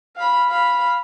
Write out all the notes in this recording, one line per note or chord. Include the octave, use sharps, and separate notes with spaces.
F5 B5
F5 B5